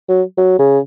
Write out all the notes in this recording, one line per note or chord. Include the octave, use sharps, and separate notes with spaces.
F#3
F#3
C#3